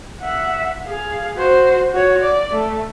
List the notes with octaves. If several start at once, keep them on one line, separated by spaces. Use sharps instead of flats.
E5 F#5
G#4 F5
F#4 C5
F#4 C#5
D5
A3